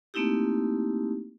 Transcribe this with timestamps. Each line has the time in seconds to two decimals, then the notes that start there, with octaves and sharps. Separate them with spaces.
0.14 A3 A#3 C4 D#4 E4 G4